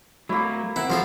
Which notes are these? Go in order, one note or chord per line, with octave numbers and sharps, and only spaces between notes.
F#3 A3 A#3 E4
C4 E4 A#4 F#5
F3 F#3 F4 G#4 A4